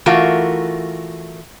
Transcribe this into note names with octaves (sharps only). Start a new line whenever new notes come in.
E3 A3 F4 F#4 A#4